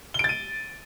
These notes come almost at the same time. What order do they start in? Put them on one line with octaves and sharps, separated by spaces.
G7 D7 A6 D#7